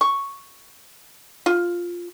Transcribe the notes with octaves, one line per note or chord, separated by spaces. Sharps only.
C#6
F4